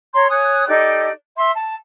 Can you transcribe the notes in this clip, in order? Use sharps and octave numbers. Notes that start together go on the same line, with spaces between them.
C#5 A#5 C6
C#5 G#5 D#6 F#6
D#4 G4 A4 D5
E5 C6
A5